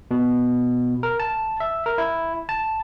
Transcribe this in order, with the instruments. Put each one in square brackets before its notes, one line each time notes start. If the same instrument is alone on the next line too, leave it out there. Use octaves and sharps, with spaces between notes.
[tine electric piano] B2
A#4
A5
E5
A#4
E4
A5